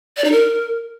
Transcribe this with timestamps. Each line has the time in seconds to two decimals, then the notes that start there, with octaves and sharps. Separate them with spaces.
0.17 D5
0.24 D#4
0.32 A#4